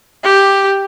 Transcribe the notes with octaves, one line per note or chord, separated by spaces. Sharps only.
G4